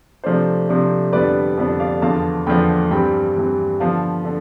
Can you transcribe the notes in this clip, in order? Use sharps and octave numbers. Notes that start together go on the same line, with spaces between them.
C3 F3 A3 D4 C5
C3 F3 A3 D4
F2 D3 G3 B3 D4 B4 D5
F2 D3 G3 B3 D4
D5 F5
E2 D3 F3 B3 F5 A5
E2 D3 F3 B3 G5 B5
G2 E3 G3 C4 G5 B5
G2 E3 G3 C4
D3 F3 B3 F5 A5
D3